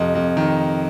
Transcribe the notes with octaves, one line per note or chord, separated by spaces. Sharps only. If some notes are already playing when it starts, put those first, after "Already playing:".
Already playing: F2 C3 D#5
F2
D#3